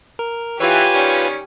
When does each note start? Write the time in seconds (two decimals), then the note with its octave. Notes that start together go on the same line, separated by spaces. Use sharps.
0.19 A#4
0.60 E3 F4 G4 B4 C#5 G#5
0.94 D#3 G3 C#4